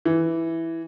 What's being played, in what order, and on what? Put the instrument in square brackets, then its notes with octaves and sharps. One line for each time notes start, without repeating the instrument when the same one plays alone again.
[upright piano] E3